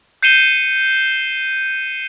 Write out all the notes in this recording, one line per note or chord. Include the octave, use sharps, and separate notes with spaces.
G6 C7 C#7 D#7 E7 G7